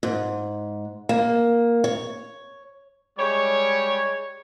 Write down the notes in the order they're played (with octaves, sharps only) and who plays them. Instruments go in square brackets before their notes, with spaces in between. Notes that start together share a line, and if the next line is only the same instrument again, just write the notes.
[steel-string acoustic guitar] G#2
A#3
C#5
[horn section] G3 G#3 G#4 C#5